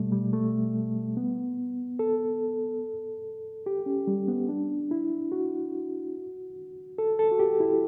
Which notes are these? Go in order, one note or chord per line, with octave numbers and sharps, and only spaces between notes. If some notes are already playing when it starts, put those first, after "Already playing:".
Already playing: B2 G3 A3
G3
A3
B3
A4
G4
C#4
G3
B3
D4
E4
F#4
A4
A4
F#4
G4
E4